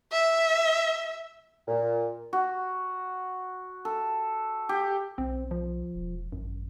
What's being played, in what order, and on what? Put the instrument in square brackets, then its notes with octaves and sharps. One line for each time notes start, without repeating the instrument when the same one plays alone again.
[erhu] E5
[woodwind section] A#2
[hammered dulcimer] F#4
A4
G4
[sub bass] B1 [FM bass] C4
[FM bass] F3
[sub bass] E1
[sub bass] G#1 [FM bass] F#2